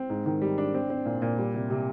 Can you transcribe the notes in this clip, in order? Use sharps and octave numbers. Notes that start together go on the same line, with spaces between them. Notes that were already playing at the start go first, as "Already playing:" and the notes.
Already playing: C4
G#2
D#3
G3
D4
C4
C4
A#2
A#2
G3
C3
C3